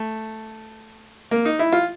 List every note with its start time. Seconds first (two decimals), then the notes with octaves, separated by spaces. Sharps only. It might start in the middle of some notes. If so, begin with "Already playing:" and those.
Already playing: A3
1.31 A#3
1.45 D#4
1.59 E4
1.72 F4